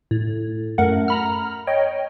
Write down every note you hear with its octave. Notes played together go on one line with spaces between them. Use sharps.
A2
F#2 A3 A#4 F#5
A#5 B5 F6
C#5 D#5 G5